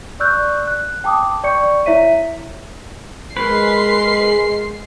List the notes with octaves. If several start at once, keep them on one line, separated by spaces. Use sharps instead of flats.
D5 C#6 E6 F#6 G6
F#6
G5 A5 D6 D#6
D5 G5 C#6 G6 C#7
E4 C#5 E5 B6 D#7
G#3 A#4 B4 C6 C7